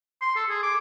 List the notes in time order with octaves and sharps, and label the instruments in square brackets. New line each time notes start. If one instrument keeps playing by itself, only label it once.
[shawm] C6
A4
G#4
D6